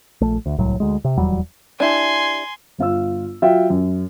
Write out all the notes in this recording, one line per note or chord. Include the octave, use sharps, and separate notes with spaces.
A#1 A3
D2
D1 C2 A2 F#3
D2 G#3
C3
D#1 E2 F#3 G3
D4 E4 G4 G#5 C6
G1 F4 E6
F#3 F4 E5 G5
F#2